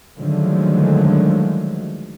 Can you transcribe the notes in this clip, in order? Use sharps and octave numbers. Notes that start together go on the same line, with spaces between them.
D3 D#3 F3 F#3 G#3 A3